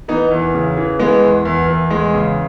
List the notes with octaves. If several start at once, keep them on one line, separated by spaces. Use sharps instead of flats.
E3 B3 D#4
E2
C#3
E3
E3 G#3 B3
E2
E2
E2
E2 G#3
C#3